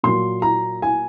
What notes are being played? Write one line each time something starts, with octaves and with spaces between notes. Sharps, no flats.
A#2 F#3 A#3 C6
A#5
G#5